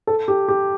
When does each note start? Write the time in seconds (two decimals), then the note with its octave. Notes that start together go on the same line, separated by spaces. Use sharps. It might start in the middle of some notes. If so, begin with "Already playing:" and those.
0.07 A4
0.28 G4
0.48 G4